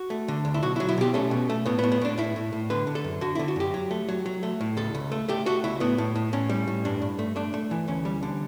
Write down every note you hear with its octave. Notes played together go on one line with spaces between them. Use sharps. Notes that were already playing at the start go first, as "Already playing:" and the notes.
Already playing: F#4
A3
D3
D2
E4
B1 F#4
E4
F#3
E4
B2 G4
A3 C#4
B2
A3
A2 B3
B3
A2
B3
A2 D4
A2 E4
A2
A2
D3 B4
D3
A4
F#2
D3 F#4
D3 E4
F#4
F#2 G4
F#3
A3
F#3
F#3
A3
A2
C#2 A4
C#2
A3
A3 G4
A3 F#4
C#2 E4
A2 B3
A2
A2
A2 C#4
G3
A2
G2 D4
G2
A3
A3 D4
A3
E3
D2 C#4
G3
D3